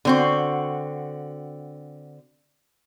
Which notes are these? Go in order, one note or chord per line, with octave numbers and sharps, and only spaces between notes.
D3 C4 F#4